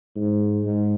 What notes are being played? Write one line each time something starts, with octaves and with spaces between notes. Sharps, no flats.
G#2
G#2